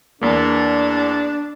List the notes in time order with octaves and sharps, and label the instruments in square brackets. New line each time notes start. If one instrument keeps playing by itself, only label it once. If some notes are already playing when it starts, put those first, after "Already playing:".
[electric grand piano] E2 A#3 [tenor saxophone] D4